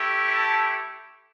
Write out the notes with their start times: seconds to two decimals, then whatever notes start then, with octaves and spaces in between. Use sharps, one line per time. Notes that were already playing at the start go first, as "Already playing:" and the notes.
Already playing: A3 E4 G4
0.35 A5